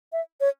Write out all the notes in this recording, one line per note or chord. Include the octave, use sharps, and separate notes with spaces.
E5
C#5